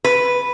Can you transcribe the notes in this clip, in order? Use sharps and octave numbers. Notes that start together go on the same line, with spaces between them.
B4